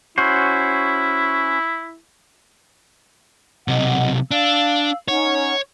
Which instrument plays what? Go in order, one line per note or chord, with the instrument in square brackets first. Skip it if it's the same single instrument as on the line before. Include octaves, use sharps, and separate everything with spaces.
[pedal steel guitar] C#4 F#4 C5 [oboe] E4
[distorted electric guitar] B1 C3 [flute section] D#5 F#5
[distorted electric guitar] D4 [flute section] F5 E6
[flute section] C#4 D#4 F#5 [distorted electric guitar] C#5